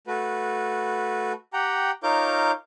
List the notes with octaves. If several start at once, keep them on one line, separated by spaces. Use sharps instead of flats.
A3 F#4 B4
G4 F#5 G5 A#5
D#4 F4 A#4 C#5 D6 G6